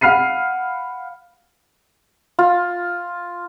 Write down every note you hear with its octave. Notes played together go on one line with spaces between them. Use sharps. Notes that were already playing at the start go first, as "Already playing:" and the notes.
F5 F#5 B5 F6 C7 D#7
F4